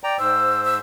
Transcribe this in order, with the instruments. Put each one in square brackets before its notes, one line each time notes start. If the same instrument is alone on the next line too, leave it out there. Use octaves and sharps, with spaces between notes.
[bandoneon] D5 G5 A#5
[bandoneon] G#2 C5 [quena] E6
[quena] E6